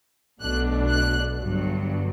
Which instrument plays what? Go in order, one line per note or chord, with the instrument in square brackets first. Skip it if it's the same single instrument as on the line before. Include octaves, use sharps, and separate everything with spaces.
[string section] B1 B2 A3 D4 F#6
F#6
G1 G2 F#3